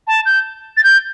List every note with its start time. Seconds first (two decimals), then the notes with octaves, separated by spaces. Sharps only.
0.07 A5
0.26 G6
0.77 A6
0.84 G6